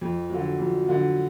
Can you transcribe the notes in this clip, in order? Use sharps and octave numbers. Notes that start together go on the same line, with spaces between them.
F2
D3 F#3
F2
D3 F#3